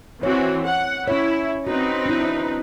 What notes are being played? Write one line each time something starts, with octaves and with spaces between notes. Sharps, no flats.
E3 C4 F#4 C#5
F#5
C#4 E4 C#5
C4 D#4 F#4 B4
D4 E4